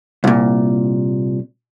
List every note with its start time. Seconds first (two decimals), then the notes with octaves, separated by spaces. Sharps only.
0.24 C2 A#2